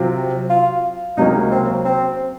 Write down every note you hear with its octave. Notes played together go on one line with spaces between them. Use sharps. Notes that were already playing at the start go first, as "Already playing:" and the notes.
Already playing: C3 F#3 C4 F4
F4
C#2 C3 F#3 A#3 C#4 D#4
C4
C4